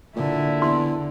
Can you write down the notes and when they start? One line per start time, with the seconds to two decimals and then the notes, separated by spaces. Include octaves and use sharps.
0.16 A#2 D3 E4
0.62 E2 C6